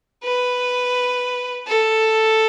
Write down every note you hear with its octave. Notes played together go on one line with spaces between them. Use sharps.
B4
A4